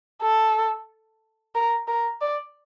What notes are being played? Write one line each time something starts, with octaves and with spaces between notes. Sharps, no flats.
A4
A#4
A#4
D5